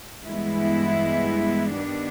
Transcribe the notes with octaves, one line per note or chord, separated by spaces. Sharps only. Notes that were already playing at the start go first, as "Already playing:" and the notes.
G2 E3 G#3 B3 E4
D#3 G3 B3 D4